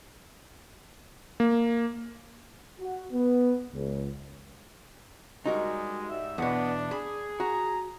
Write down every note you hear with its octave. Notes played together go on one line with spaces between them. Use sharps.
A#3
F#4
B3
C#2
G3 G#3 D#4 F#4 A#4
G#2 G3 E5
E2 B2 B3 D4
G#4 B5
F#4 A#5